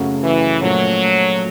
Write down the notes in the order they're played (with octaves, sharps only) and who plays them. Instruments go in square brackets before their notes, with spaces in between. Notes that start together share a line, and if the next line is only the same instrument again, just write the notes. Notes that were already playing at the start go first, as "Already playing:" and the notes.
Already playing: [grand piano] F#2 C#3 F#3 A3
[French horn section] E3
[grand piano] A#2 F3 A3 C#4 [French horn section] F#3